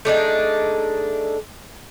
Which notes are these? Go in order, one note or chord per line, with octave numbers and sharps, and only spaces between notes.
A3 D4 D#4 G#4